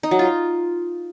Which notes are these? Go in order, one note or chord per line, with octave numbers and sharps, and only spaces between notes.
D#4
F#3
F4